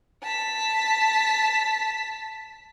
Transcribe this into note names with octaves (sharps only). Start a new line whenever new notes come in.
A5 B6